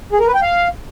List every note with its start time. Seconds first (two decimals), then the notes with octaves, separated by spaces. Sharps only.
0.13 G#4
0.20 A#4
0.27 B4
0.35 G5
0.42 F5